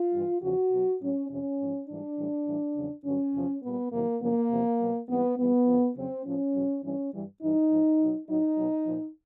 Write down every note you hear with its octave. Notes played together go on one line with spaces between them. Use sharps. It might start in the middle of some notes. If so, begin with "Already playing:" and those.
Already playing: F4
G2 E3 G3
E2 C#3 F3 F#4
B2 F#3
A2 F#3 C#4
F2 C3 F3 C#4
G#2 F3
G#2 E3 G3 D4
A2 E3 G3
A2 E3 G3
E2 C#3 F#3
G2 D3 F#3 C#4
E2 C3 F3
A#2 G3 B3
F2 C3 D#3 F#3 A#3
F#2 C#3 F3 A#3
E2 C3 F3
B2 F#3
G#2 E3 G3 B3
G2 E3 G3 B3
F2 D3 F3
F2 C#3 F#3 C4
A2 F3 C#4
E2 B2 F#3
G2 E3 G3 C#4
G2 E3 G3
G2 E3 G3 D#4
G#2 F3
B2 F#3
A2 F#3 D#4
B2 F#3
A#2 F3